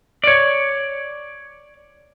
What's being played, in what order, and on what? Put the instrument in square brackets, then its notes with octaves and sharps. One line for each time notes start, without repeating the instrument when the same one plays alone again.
[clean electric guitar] C#5 D5